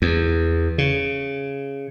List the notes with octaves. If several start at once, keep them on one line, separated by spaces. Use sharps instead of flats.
E2
C#3